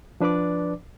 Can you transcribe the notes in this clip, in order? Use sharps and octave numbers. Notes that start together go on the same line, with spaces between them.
F3 D4 B4 D5 D6